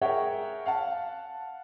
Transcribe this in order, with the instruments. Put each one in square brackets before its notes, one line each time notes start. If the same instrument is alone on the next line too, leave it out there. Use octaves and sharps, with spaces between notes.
[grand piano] G#4 A#4 C#5 E5 F#5 G5
F5 F#5 A5